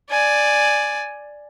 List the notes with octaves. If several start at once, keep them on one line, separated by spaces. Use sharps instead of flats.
D5 G#5